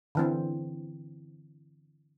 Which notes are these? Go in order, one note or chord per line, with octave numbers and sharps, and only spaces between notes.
D3 E3 C4